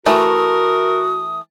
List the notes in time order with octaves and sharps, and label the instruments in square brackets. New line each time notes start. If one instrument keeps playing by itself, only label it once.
[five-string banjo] E3 A3 [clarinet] F#4 [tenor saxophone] A#4 [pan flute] D#6